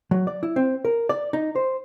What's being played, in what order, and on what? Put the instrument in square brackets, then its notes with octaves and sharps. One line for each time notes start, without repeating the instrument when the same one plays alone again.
[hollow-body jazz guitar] F#3
D5
E4
C4
A#4
D5
D#4
C5